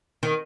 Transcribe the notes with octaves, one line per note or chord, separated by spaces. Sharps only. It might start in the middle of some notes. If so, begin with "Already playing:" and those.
D#3